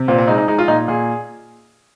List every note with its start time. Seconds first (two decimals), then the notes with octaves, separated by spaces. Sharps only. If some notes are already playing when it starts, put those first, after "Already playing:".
Already playing: C3
0.08 A#2 C4
0.18 C4
0.28 G#3 D#4
0.38 D#4
0.48 G#3 D#4
0.58 F4
0.68 A#2 D#4
0.88 A#2 G#4